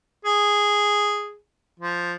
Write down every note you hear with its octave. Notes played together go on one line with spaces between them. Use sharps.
G#4
F3